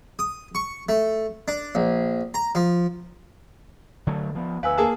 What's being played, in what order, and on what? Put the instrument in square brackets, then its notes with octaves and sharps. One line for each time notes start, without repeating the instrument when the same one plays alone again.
[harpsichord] D#6
C#6
A3
D4
A#1
A#5
F3
[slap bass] D3 F#3 A3
F3 B3
[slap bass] D2 [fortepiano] B4 [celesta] F5 G#5 E6
[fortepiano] A#3 G#4 A5